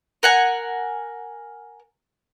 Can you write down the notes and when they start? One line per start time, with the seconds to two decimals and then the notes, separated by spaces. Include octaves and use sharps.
0.23 A#4 F#5 G#5